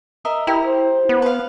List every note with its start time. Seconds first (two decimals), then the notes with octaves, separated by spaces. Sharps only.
0.25 A#4 D#5 E5
0.47 E4 G4 A#4
0.63 C5
1.09 B3
1.22 B4 F5